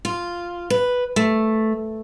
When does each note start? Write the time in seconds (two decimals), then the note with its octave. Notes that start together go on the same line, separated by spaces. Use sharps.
0.05 F4
0.70 B4
1.16 A3